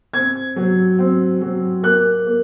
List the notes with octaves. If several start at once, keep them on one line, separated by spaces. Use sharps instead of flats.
C4 G#6
F#3
C4
F#3
A#3 F#6
A#3